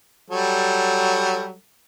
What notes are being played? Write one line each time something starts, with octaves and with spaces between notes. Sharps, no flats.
F#3 G3 A4